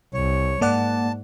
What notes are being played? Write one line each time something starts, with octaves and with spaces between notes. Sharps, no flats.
C2 C#5
G#2 A#3 D5 F#5 A5